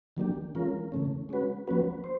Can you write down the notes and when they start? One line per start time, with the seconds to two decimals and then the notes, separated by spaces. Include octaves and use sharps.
0.17 D#3 F#3 A#3 D4 G4
0.55 E3 G#3 C#4 F4 A#4
0.92 C#3 E3 A3 C#4
1.29 G#3 C#4 F#4 B4
1.68 F3 A#3 C#4 F#4 B4
2.04 C5